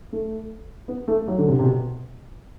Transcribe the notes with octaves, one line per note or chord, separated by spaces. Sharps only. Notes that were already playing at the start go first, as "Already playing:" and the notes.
A3
B3
A3
F#3
D3
C3
C3
B2